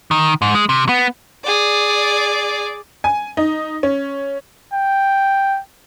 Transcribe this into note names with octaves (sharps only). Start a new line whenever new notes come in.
D#3
G#2
G#3
C3
B3
G#4 D5
G#5
D#4
C#4
G5